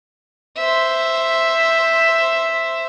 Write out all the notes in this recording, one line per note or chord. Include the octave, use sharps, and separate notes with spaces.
C5 E5